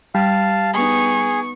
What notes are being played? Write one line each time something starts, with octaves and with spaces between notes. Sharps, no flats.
G3 F5 A5
B3 D#4 G#4 C#6